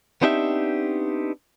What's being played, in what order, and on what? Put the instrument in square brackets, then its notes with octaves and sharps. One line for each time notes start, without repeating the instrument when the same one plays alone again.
[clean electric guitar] B3 C4 D4 D#4 G4 E5